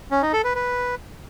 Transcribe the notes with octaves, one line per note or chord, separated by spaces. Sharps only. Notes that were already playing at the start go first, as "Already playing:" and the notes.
C#4
D#4
A4
B4
B4